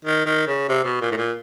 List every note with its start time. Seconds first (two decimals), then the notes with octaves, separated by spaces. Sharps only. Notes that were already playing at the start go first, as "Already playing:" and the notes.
0.05 D#3
0.26 D#3
0.47 C#3
0.69 C3
0.85 B2
1.01 A#2
1.11 A2
1.17 A#2